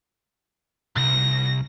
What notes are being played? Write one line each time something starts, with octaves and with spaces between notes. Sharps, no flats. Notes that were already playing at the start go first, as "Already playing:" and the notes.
C2 A#6